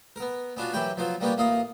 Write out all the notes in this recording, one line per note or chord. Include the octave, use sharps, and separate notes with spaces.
B3 A#4
B3 C#4 D4 F4 F#4 C#5
F#2 E3 C#4 G4 G5 B5
F3 F#3 B3 F4 C5
G3 A#3 B3 C#4 F4 G4
A1 A#3 F4 F5 D#6